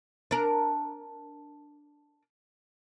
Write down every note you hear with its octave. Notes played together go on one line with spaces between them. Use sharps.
D4 A#4